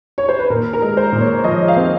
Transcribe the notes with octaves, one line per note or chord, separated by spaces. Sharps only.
C#5
C5
B4
A#2 A#4
A#4
G#3
C5
A#2
C#5
F3 D#5
F5
C4